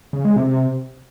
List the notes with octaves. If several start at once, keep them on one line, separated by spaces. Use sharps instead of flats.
C#3
G#3
C3